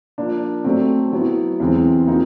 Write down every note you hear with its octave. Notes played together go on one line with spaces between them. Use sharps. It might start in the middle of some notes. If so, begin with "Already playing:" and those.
F3 A#3 D4
F#3 A3 C4
F#3 B3 E4
E2 C3 E3 G#3 C4
C3 F3 A#3 D#4